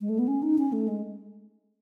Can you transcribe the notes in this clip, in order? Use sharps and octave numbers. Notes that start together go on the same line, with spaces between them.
G#3
A3
B3
C#4
D#4
C#4
A3
G#3